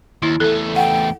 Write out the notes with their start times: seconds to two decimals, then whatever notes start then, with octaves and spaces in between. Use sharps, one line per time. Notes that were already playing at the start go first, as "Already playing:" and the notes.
0.22 D#2 E4
0.40 E2 A3 A4
0.76 F#5 G5